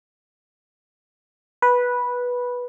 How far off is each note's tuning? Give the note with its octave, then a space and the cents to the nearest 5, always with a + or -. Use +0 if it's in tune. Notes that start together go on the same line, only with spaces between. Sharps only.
B4 -10